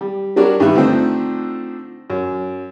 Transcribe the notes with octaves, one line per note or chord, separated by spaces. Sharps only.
G3
F#3 G3 D4 F#4 A#4 D5
G2 D#3 B4 E5
D3 F3 A3 C4 D4 D#4
F#2